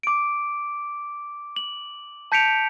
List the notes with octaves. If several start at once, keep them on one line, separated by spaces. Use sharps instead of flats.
D6 D7
F#7
A5 G6 B6 C#7 D7 F7